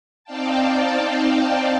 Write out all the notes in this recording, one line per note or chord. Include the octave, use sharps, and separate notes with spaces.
C4 D#4 D5 F5 G5 A5